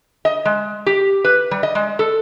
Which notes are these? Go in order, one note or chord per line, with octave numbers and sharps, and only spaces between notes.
D#5
G#3
G4
B4
G3
D#5
G#3
A4